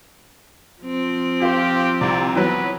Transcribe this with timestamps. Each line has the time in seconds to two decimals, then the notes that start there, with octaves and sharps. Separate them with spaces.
0.83 F3 C4
1.42 F4 G4 C5
2.01 C2 C3 D5
2.35 E3 F#3 B3 B4